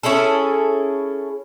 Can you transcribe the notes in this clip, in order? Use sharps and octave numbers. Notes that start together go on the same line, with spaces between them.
C#4 E4 G#4 A4